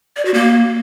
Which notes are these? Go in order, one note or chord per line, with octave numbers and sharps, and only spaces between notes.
D5
F#4
A#3